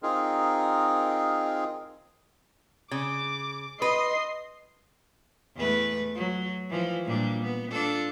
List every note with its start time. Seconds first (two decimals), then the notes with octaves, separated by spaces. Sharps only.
0.03 C4 D#4 F4 G#4 A#4
2.91 C#3 D6
3.82 B4 D#5 C6 C7
5.56 E2 A3 B4
6.15 F#3
6.69 E3 F3
7.05 A#2 G3 D4
7.43 B3
7.71 D4 F4 A4